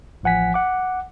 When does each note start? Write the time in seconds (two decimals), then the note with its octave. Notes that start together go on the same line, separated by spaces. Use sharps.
0.23 A1 F3 F#5 G#5 B6
0.54 F#5 D6